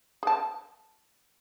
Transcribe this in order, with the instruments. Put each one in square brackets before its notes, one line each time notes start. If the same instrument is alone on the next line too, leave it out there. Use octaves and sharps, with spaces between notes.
[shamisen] G#4 A5